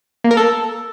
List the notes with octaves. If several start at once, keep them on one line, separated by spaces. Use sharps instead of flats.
A#3
A#4
A4